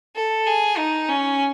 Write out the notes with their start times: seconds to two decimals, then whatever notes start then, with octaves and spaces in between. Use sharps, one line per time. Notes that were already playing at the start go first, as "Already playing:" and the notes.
0.15 A4
0.46 G#4
0.78 D#4
1.08 C#4